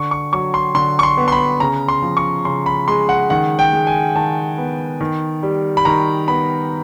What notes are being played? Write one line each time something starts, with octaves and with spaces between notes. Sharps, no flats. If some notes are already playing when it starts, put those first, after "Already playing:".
Already playing: D3 C#6
C#6
F#3 C#6
C6
D3 C6
C#6
C6
B3
C6
B5
C#3 A#5
C6
F3
C#6
C#3 C6
B5
G#3 C6
F#5
D#3 F#5
G5
G#3
G#5
D#3 A5
B3
D#3
G3
B5
D#3 A#5
B3 B5